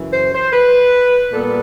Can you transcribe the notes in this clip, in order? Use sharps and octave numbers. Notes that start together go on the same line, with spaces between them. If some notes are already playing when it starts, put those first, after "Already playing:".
Already playing: F#2 C#3 E3
C5
C5
B4
A#2 G3 B3 A4